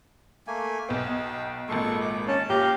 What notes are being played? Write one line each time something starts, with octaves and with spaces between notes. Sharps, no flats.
A3 A#3 G#5
B1 B3 G5
G#1 A#2 G#3 A4 C#6
D6
C#4 A5
A#1 G4 F5 A#5